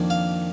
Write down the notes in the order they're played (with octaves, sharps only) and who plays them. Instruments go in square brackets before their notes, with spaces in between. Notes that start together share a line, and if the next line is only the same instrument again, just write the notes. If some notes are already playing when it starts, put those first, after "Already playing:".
Already playing: [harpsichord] F2 D#3 A#3 D4
F5